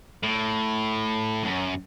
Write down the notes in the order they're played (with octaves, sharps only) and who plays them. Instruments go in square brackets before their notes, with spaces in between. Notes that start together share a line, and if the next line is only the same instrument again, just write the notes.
[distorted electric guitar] A2
F#2